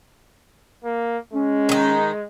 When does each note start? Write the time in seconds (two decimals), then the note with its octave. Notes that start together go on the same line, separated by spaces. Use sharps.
0.84 A#3
1.33 G#3 C#4
1.69 D#3 D#4